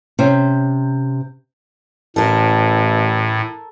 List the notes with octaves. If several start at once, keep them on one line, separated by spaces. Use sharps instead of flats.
C3 C#4 C5
A1 A2 A4 A#4